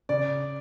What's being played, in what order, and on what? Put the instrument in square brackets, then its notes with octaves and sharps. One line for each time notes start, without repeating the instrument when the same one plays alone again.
[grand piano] C#3 D5